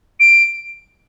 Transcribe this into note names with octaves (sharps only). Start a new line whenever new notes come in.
D7